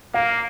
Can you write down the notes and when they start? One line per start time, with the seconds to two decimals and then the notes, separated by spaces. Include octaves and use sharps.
0.14 A#3 F5